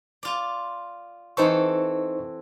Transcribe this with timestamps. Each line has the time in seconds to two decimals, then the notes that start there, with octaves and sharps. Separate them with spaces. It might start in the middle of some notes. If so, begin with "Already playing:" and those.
0.23 F4 D5
1.37 E3 C4 D#4 A4 C5 C#6